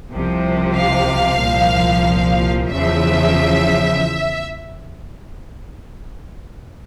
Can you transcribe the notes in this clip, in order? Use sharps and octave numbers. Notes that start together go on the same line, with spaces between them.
C2 C3 F3
F5
C2 A#2 F3
E2 C#3 F3 E5